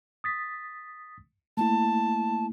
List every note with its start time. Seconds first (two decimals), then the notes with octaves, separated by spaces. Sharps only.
0.24 D#6 A6 B6
1.57 A3 A#3 E4 A5